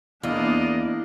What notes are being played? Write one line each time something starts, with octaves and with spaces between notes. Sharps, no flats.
E2 A#3 D4 D5 D#5 F5